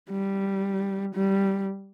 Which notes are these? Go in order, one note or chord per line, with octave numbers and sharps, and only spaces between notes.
G3
G3